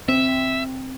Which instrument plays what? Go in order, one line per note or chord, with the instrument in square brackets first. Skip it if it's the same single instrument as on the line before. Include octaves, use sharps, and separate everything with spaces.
[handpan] C4 [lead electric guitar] E5